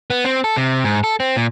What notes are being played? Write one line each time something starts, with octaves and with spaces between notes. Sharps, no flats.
B3
C4
A4
C3
G#2
A4
C4
A#2